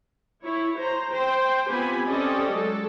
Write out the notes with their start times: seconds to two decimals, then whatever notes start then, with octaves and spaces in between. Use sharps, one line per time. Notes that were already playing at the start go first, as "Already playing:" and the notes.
0.42 E4 C#5
0.75 C5 A#5
1.11 C5 G5
1.68 B3 C4 F4 G4 G#5 B5
2.06 C4 C#4 G4 A4 D5 D#5
2.53 F#3 G#3 A4